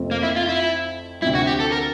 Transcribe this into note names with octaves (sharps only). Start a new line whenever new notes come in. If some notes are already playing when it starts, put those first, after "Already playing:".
Already playing: F2 C3 F3 A3 C4
A#3
E4
F4
E4
D2 C3 F3 E4
F#4
G4
A4
A#4